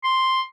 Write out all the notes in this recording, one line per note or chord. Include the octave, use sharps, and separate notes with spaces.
C6